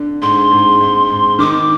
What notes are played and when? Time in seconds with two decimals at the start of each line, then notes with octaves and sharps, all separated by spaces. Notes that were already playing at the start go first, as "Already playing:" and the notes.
Already playing: D3
0.22 G#2 C6
0.51 G#2
0.80 G#2
1.10 G#2
1.39 D#3 D6